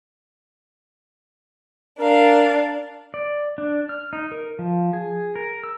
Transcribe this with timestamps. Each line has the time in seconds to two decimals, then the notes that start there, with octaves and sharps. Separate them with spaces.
1.99 D4 A#4 F5
3.14 D5
3.58 D4
3.89 F6
4.13 D#4
4.32 A#4
4.59 F3
4.93 G#4
5.36 A#4
5.64 E6